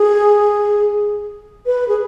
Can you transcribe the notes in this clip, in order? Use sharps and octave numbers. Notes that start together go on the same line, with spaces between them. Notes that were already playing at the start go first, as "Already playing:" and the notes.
Already playing: G#4
B4
G#4